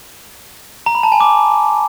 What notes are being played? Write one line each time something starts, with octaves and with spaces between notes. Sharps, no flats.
A#5
B5
A5
G#5
D6